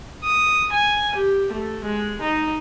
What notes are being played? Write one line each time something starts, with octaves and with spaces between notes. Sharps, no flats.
D#6
G#5
G4
A3
G#3
D#4